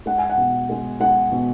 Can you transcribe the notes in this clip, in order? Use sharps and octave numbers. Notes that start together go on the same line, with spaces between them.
G#3 F#5
G#5
F#5
B2
G#3
G#3 F#5
B2